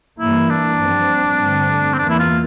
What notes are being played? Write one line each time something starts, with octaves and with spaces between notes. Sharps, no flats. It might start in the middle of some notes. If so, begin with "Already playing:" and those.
G2 E3 A#3 E4
D4
G2 F3 C4
G2 D3 A3 C4
C4
E2 E3 A#3 D4
E4
F4